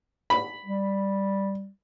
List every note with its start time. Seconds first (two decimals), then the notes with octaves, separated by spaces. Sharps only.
0.30 B5
0.66 G3